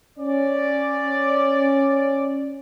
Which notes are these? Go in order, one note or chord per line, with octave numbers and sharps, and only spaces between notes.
C#4 D5